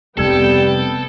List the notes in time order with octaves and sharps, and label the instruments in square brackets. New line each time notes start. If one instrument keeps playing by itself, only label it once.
[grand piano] F1 E6 G#6 [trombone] G3 [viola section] B3 G5 [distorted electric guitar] A4